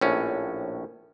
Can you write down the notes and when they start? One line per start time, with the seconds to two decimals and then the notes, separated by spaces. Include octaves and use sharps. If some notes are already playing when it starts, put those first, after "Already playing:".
0.01 A#1 A2 C#4